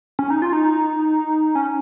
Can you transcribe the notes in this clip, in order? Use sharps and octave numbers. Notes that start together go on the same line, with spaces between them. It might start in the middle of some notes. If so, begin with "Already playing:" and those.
C#4
D#4
F4
D#4
C#4